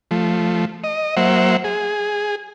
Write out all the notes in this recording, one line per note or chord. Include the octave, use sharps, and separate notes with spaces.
F3 A3
D#5
F#3 A#3 C5 E5 F#5
G#4